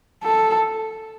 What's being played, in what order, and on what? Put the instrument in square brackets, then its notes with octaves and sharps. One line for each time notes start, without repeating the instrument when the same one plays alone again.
[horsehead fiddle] A4